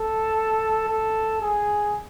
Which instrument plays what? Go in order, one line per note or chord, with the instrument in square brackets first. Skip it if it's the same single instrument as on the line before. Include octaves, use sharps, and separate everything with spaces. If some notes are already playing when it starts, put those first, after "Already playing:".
Already playing: [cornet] A4
A4
G#4